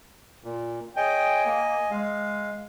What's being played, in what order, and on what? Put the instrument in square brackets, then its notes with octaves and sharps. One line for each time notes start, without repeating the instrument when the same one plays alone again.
[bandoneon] A#2
[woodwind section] G#4 C#5 G5 [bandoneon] D#5 G#5
[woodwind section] A#3
[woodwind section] G#3 [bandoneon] F5